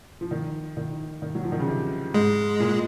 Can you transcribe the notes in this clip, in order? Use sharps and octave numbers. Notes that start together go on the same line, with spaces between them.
F3
D#3
D#3
D#3
F#3
F3
D#3
C#3
C3
G#2 G#3
A#2